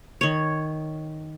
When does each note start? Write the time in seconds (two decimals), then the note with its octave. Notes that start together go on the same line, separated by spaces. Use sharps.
0.21 D#3 C#5